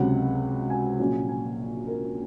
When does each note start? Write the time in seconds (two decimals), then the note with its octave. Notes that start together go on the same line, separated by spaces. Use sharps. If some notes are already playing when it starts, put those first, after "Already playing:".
Already playing: C#2 C3 F#3 C#4 F#5
0.70 G#5
0.99 A#1 A#2 F#3 C#4
1.29 G#5
1.87 A#4